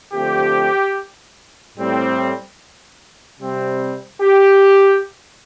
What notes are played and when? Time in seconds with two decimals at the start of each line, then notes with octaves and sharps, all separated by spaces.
0.14 D3 F3 A3 C4 G4
1.77 A2 G3 C4
3.40 C3 G3 C4
4.22 G4